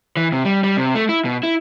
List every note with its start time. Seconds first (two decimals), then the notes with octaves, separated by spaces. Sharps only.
0.17 E3
0.32 C3
0.45 G3
0.64 G3
0.77 C3
0.95 A3
1.09 E4
1.25 B2
1.43 E4